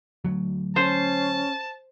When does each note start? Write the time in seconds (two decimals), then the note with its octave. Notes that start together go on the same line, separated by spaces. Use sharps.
0.24 D2 F#3
0.76 C#4 C5 A5